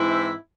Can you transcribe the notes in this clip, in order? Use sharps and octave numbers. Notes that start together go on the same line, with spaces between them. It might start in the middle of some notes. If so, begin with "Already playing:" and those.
Already playing: G#2 E3 C4 E4
E5